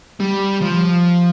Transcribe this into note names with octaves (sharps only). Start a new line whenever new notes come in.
G3
F3